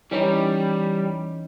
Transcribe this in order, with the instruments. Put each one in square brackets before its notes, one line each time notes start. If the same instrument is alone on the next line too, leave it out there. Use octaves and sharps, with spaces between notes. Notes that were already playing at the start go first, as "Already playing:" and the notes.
[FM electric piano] E3 C#4 D#4 [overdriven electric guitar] G3